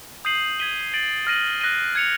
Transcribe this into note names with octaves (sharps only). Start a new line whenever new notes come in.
D#6 G6 C7 D#7 F#7
G#6 B6 D#7 G7
A6 D7 F#7
F6 A#6 D#7 F#7
F#6 A#6 D#7
G#6 C#7 F7